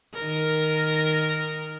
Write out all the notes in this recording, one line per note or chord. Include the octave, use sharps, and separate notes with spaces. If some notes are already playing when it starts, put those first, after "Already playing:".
D#3 A#4